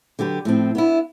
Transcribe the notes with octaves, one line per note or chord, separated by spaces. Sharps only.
D3 F#3 G4 B4
A2 F3 C4
B3 D4 E4